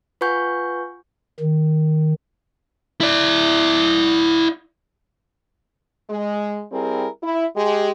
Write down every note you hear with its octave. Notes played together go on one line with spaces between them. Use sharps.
F4 B4 F#5 G#5 C#6 G6
D#3
E4 D5
G#3
G3 C4 E4 G#4 A#4
E4
G#3 G4